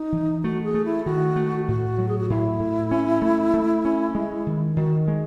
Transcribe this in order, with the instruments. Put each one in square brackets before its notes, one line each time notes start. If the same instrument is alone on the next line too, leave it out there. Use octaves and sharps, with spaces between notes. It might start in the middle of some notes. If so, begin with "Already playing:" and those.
Already playing: [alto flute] D#4
[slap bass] E3
[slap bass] A3 [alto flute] F#4
[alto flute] G#4
[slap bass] A3
[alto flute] E4
[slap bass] D#3 [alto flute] F#4
[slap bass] A3
[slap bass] A2 [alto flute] F#4
[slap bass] F#3
[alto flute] G#4
F#4
[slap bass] A2 [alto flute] E4
[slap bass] A2
C#4
A3
A3
C#4
G#3
D#3
[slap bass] D#3 [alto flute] F#4
[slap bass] G#3